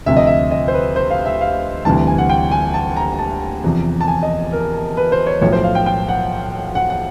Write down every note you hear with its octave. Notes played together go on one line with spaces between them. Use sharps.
D2 C3 F3 E5
D#5
E5
D#5
C5
B4
C5
F5
E5
F5
D2 C3 E3 G3 A5
G#5
F#5
G5
G#5
A5
A#5
A5
E2 C3 F3
A5
G#5
D#5
A#4
B4
C5
C#5
B1 A2 F3 C#5
C5
F5
G5
G5
F#5
F#5
F#5